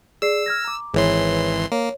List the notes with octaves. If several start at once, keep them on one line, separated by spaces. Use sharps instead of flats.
G#4 D5 E6 C7
F6 G#6 A#6
A#5 D6
G#1 E3 G#4 B4 C#5 C6
A#3 C#5